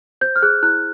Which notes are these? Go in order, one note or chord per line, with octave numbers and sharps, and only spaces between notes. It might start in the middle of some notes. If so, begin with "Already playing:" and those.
C5 G6
F6
G#4 F#6
E4 F#6